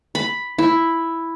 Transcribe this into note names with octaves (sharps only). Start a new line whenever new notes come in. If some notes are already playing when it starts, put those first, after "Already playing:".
B5
E4